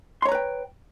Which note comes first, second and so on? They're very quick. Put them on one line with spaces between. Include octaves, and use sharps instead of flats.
C6 C#5 A#5 B4 G5